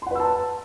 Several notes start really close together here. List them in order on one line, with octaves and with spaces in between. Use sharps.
C6 F#5 B4 E6 A5